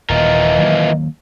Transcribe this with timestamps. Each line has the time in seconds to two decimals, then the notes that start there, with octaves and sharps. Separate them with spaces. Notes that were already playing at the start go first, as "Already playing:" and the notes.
0.09 D#1 E3 F4 A#4 D#5
0.58 D#3 F#3 A#3